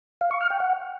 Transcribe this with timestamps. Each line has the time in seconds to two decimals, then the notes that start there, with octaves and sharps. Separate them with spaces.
0.21 F5
0.31 C#6
0.41 F6
0.50 G5
0.60 F#5